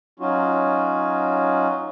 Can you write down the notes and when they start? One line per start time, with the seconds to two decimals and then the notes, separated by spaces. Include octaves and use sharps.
0.20 F#3 C#4 D#4 F4 F#4